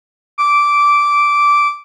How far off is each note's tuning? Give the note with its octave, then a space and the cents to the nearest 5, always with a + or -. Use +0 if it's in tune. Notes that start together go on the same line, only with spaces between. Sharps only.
D6 -10